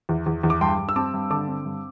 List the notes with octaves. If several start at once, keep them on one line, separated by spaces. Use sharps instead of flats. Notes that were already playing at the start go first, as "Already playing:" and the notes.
E2
E2
E2
D6
G2 G5 C6
G2
E6
C4 A5 D6
G2
D3 A5 D6
C4
G2